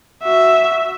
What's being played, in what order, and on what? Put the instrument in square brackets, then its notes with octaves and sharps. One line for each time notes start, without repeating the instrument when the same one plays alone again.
[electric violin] F#4 E5